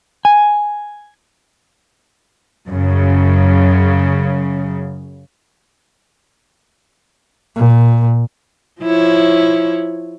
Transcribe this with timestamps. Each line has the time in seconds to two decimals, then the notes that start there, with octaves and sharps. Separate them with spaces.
0.25 G#5
2.69 F#2 C#3
7.56 A#2
8.81 F3 E4 C#5